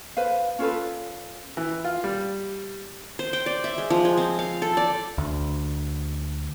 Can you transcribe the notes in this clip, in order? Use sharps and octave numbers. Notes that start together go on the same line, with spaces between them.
B4 C5 F5
C#4 F4 A4 B4
E3
F4
G3
C5
G5
D5
E5
G#3
F3
G#3
C4
F5
A4
D5
D2